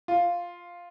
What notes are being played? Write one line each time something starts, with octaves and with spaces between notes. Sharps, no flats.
F4